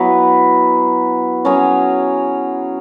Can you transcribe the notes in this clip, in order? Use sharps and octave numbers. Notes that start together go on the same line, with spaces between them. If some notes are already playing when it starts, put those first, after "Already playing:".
Already playing: F#3 B3 E4 B4
F#3 C#4 G#4 C#5